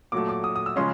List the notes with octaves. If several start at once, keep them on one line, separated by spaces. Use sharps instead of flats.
A#2 F#3 A3 D6
D6
D#6
D#6
E6
C#3 F3 G#3 C#4 C6